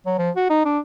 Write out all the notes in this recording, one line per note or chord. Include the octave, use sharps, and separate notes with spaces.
F#3
F3
F#4
D#4
D4